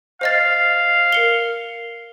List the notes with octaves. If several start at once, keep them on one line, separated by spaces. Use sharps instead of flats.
C5 D#5 F5 A6
A#4 C#7 G7